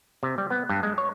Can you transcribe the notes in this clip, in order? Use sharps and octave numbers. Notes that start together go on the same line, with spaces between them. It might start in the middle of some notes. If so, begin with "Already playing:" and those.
C3
G3
B3
G2
G#3
C#5